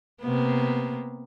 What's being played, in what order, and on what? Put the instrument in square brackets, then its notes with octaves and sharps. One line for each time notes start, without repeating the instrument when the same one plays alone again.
[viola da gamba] C3 A#3 B3